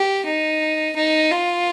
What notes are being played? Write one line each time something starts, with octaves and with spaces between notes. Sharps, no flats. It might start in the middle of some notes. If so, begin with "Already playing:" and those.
Already playing: G4
D#4
D#4
F4